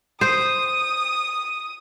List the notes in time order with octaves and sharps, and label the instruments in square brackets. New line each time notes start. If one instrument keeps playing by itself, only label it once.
[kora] C5 [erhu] D#6